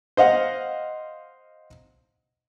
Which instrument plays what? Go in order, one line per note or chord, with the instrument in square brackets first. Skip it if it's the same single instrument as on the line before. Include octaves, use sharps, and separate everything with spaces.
[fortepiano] C5 D#5 F5 F#5